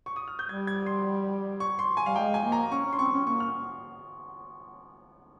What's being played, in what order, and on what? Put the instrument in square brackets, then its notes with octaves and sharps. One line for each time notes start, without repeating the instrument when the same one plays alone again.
[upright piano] C#6
D#6
F6
G6
[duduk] G3 [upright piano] G#6
[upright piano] G#6
C6
C#6
C6
G#5
[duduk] G3 [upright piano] F5
[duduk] G#3 [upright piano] G5
[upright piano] G#5
[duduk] A#3
[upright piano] A#5
[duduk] C#4 [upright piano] C#6
[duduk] C#4
[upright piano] C6
[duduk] C4 [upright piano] C#6
[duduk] C#4
[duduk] A#3 [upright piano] C#6
[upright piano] F6